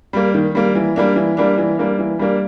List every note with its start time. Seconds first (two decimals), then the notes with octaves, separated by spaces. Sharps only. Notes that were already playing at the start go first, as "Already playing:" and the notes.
0.13 G3 A#3
0.34 D#3
0.55 G3 A#3
0.75 E3
0.96 G3 A#3 D4
1.16 E3
1.37 G3 A#3 D4
1.58 E3
1.78 G3 A#3 D4
1.99 E3
2.19 G3 A#3 D4